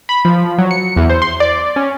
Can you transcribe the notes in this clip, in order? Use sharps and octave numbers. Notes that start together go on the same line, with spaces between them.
B5
F3
F#3
C#7
E2
C5
C6
D5
C#4